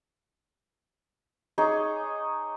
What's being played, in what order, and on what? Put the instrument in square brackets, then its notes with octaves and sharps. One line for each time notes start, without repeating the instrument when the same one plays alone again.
[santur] D#4 G#4 C#5 D6